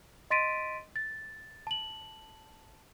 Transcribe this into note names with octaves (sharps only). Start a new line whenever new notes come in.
D#5 C6 A6 B6 D7 D#7
A6
A5 F#7